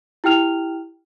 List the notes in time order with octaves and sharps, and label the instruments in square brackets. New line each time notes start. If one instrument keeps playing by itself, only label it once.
[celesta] E4 G4 G5 F6 F7